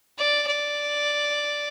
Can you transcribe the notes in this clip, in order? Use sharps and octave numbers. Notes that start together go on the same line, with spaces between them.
D5
D5